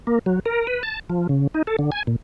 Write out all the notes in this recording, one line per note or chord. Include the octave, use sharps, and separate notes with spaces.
A#3
F#3
A#4
B4
A5
F3
C#3
D#4
A4
D3
G#5
A#2